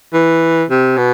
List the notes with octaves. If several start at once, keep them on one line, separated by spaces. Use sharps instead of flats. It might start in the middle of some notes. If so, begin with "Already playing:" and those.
E3
C3
B2